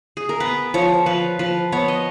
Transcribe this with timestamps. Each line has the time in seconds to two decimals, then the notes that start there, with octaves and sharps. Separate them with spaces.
0.17 G#4
0.29 A#4
0.40 B3 B4
0.74 F3 C#5
1.06 F3 B4
1.39 F3 B4
1.72 B3 C#5
1.88 D#5